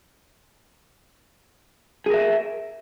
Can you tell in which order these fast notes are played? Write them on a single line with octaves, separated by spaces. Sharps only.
G#4 A#4 E5